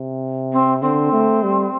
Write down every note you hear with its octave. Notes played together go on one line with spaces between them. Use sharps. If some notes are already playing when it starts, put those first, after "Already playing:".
Already playing: C3
C4
D3 C4
A3
G3